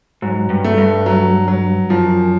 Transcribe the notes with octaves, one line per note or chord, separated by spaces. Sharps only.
G#2 F#3
G2
A3
G2
F#3
F#3
F#2 F3